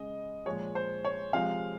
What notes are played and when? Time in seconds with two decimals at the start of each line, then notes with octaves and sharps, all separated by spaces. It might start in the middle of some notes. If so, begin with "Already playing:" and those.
Already playing: C#3 G#3 D#5
0.46 A#2 F3 G#3 C#5
0.75 C5
1.05 C#5
1.33 C3 F3 G#3 F5